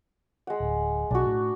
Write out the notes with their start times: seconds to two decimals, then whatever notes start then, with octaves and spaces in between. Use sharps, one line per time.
0.47 G#3 F#5
0.60 D1
1.11 B1 D4 F#4
1.26 A2